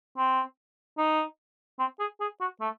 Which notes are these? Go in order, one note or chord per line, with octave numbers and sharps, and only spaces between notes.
C4
D#4
C4
G#4
G#4
F#4
A3